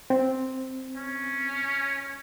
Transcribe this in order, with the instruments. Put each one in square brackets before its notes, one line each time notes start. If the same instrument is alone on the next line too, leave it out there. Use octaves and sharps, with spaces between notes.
[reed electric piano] C4
[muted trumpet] C#4